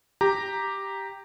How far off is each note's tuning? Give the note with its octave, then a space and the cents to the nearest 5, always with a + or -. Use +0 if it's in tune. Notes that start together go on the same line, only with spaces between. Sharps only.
G4 +0 A#5 +0